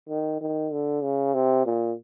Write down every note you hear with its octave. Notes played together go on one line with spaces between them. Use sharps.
D#3
D#3
D3
C#3
C3
A#2